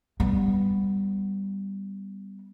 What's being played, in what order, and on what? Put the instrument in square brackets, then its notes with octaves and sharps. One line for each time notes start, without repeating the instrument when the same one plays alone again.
[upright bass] G3 B3